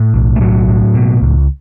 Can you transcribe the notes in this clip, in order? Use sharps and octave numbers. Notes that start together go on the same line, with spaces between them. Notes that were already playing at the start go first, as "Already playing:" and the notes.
Already playing: A2
B1
A3
A2 F#3
A2
B2
C#2